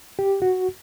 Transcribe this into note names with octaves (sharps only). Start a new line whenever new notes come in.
G4
F#4